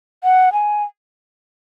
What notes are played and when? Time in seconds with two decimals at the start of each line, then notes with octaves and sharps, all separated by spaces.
0.24 F#5
0.53 G#5